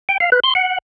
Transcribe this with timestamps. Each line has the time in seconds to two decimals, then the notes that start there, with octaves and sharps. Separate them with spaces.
0.09 G5
0.20 F5
0.32 B4
0.44 C6
0.55 F#5